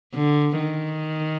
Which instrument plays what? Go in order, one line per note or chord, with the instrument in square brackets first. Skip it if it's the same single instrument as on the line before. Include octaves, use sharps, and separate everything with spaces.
[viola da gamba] D3
D#3